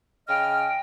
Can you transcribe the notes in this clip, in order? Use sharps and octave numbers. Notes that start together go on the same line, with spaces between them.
C#3 D#5 G5 F6